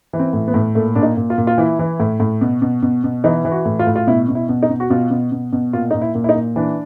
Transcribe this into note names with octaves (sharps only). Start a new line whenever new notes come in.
E3
C4
A2
B3
A2
A#2 A3
A#2 D4
D#4
A#2
F4
A#2
F4
E3 E4
E3
A2
A2
B2
B2
B2
B2
E3 D#4
E3
F#4
A2
F4
A2
F4
B2 E4
B2
E4
B2
D#4
B2
F#4
B2 F4
B2
B2
B2
A#2 F4
A#2 D#4
E4
A#2
E4
D#4
A#2
E3 D4